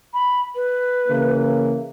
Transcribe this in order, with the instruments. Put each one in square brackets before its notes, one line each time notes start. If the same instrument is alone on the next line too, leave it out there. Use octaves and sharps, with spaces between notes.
[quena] B5
B4
[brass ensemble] C#3 E3 A#3